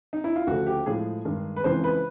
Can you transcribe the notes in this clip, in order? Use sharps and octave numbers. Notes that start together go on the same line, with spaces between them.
D#4
E4
F4
D2 C#3 F3 A3 F#4
G4
A2 F3 G#3 G#4
G2 D#3 G#3
B4
F2 C#3 E3 G#3 C5
B4